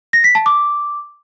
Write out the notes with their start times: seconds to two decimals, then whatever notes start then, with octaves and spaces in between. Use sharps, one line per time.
0.13 A#6
0.24 B6
0.35 A5
0.46 D6